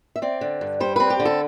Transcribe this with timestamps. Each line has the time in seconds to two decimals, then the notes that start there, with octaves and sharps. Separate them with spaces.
0.16 E5
0.22 C4 D5
0.41 D3
0.61 G2
0.80 G3 C5
0.96 C4 B4
1.10 G4
1.20 D3
1.25 A4